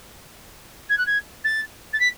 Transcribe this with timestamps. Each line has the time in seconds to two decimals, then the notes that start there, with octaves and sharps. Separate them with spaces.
0.89 G#6
0.97 F#6
1.06 G#6
1.44 A6
1.93 A6
1.99 B6